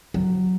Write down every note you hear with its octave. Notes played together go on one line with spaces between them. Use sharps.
F#3